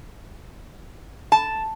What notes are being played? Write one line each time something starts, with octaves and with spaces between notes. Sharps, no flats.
A5